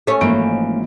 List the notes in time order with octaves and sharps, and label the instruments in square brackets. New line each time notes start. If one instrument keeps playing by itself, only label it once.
[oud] A3 C#4
[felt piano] G#1 D7 [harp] E3 F3 A#3